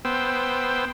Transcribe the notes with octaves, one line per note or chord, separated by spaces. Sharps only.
B3 C5 G5 E6